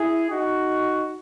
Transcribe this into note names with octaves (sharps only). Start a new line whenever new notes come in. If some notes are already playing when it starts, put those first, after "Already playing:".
Already playing: E4 G#4
D#4 F#4